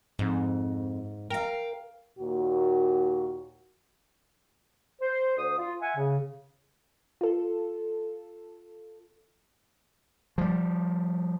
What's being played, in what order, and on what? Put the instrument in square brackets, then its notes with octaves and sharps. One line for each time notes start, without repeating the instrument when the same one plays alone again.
[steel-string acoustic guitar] F2 [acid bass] G#2
[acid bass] A#4 [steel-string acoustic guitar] F5 G5
[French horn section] D#2 A#2 F#4
[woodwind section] C5
D2 C5 D#6
F4
E5 F#5 G#5
C#3
[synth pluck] F4 A4
[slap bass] F3 G3